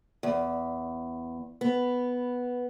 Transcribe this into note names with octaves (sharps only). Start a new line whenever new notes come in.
E2
B3